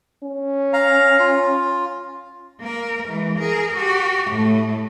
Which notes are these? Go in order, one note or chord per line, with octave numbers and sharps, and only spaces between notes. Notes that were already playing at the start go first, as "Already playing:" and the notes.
C#4
F5 A#5
F4
A#3 A#4
E3 G#3
G#4 A#4
F#4 G4
A2 A3